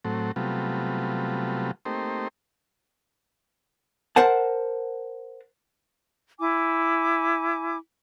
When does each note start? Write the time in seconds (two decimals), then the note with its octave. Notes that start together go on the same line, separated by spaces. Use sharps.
0.05 A2 F#3 A3 C4
0.36 C3 F#3 G3 A3 B3 F4
1.85 A3 A#3 C4 D#4 G4 C5
4.16 A#4 C5 F#5 A5
6.39 E4 G#5 D6